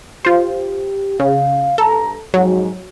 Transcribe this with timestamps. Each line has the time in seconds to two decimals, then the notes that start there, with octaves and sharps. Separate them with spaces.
0.25 F4 G4 C5
1.20 C#3 F5
1.78 G2 A4 A#5
2.34 F2 G#2 F#3